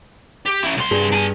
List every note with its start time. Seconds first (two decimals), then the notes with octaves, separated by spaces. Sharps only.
0.46 G4
0.64 C#4 E4
0.77 C2 C6
0.91 G2 G#4
1.12 D4 G#5